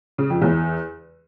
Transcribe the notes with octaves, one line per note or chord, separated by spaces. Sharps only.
C#3
F2
E2